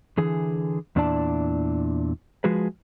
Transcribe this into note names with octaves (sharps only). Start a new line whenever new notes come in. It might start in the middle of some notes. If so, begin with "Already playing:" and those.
D3 E3 G#4
E2 A#2 D4 E4 D5 A5
F3 G#3 F#4 G#4 B4